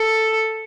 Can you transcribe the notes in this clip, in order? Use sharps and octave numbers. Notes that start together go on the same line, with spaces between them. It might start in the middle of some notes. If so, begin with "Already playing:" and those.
Already playing: A4